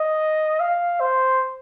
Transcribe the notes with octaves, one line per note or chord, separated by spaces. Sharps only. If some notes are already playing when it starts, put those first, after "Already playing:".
Already playing: D#5
F5
C5